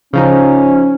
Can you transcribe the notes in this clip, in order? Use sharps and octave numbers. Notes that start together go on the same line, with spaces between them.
C#3 F3 C#4 D#4